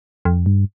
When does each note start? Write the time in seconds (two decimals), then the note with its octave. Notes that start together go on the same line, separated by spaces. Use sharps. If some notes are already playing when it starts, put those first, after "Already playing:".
0.25 F2
0.46 G2